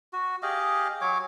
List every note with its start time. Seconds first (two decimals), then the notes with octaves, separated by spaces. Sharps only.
0.13 F#4
0.43 G4 G#4 D#5 F5
1.01 F#3 C#5 G#5 D6